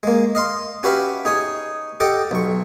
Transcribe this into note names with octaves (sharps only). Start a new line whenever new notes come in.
G#3 A#3
D#5 F5 C6
C#4 F#4 G4 B4 E5 F5
D#4 G#4 C#5 D#6
G4 A4 D#5 F#5 G5
B1 C#6